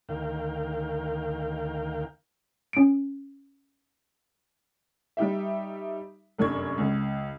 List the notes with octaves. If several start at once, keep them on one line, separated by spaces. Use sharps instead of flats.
D2 D#3 A#4 F5 G5
C#4 D7
G3 D#4 G4 E5
F1 F#2 D4 C#6 G#6
C#2